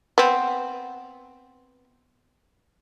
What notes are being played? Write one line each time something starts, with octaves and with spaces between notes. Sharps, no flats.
B3 C4